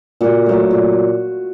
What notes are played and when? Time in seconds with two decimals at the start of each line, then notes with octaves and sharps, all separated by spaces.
0.21 A#2 F#4
0.46 F#3 A3
0.71 A#2